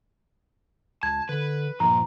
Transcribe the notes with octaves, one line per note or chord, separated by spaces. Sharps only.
C#2 A5 G#6
D3 B4
G2 A#2 F3 A#5